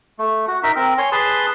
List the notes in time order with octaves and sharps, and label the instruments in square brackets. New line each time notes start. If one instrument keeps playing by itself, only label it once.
[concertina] A3
F#4
D#4 A#4 E5
C4 A#4
C#5 G#5 C6
G#4 B4 A5 C6